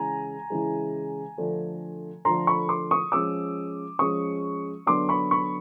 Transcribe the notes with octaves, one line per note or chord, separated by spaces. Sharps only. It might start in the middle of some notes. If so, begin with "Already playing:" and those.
Already playing: C#3 E3 G#3 G#5 A#5
C#3 E3 G#3
D3 F3 A3 D4
D3 F3 A3 D4 A#5 C6
B5 C#6
C6 D6
C#6 D#6
F3 G#3 C#4 D6 E6
F3 G#3 C#4 C#6 D#6
D3 F#3 B3 D4 C6 D6
B5 C#6
B5 C#6